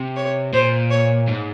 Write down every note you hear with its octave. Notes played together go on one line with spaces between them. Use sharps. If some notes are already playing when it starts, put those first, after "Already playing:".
Already playing: C3
C#5
A#2 C5
C#5
G#2